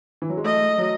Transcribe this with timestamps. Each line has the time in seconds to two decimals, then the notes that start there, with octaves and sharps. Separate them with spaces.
0.22 E3
0.29 F#3
0.37 G#3
0.44 A3 D#5
0.78 F#3